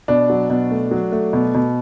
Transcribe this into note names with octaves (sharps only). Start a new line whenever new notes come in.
B2 D4
F#3
B2
A3
F#3
A3
B2
B2